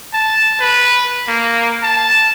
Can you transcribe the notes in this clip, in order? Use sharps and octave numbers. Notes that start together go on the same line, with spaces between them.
A5
B4
A#3
A5